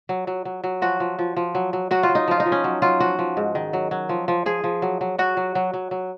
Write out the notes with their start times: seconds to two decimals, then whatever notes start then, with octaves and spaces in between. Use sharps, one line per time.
0.09 F#3
0.27 F#3
0.45 F#3
0.64 F#3
0.82 F3 F#4
1.00 F3
1.19 F3
1.36 F3
1.55 F#3
1.73 F#3
1.91 F#3 F#4
2.03 F4
2.09 F#3
2.15 D#4
2.28 F3 F4
2.40 D#4
2.46 F3
2.52 C#4
2.64 F#3
2.82 F#3 F4
3.00 F3 F#4
3.19 F3
3.37 G#2
3.55 D#3
3.73 F#3
3.91 F#3
4.09 F3
4.28 F3
4.46 F3 G#4
4.64 F3
4.82 F#3
5.01 F#3
5.18 F#3 F#4
5.37 F#3
5.55 F#3
5.73 F#3
5.91 F#3